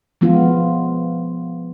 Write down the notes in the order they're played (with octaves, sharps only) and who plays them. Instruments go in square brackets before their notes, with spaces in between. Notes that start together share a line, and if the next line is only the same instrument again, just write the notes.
[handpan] F3 G#3 B3 F4